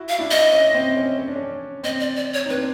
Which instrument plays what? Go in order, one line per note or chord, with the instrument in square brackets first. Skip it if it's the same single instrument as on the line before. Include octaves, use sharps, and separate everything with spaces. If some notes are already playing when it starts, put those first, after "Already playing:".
Already playing: [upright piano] E4 F#4
[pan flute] F5
[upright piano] D4 E4
[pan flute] D#5
[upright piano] C#4
C4
C#4
C#4
D4
C#4
[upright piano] C4 [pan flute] D#5
[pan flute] D5
D5
C#5
[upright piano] D#4
[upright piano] C4 D4 [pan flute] B4